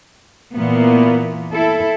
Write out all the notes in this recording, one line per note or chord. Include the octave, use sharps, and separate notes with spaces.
A#2 E3 A#3 B3
E4 A4